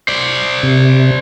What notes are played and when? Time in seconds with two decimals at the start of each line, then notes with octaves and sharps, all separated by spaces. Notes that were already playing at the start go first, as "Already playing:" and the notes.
0.08 C5 D5
0.63 C3